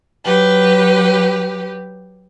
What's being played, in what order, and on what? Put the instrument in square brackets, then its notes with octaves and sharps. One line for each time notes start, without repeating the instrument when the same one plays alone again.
[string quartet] F#3 G4 B4